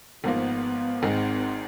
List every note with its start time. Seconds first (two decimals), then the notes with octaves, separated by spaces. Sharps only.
0.24 G#1 G#2 F3 A#3 B3
1.02 G#1 G#2 D#3 G#3 C4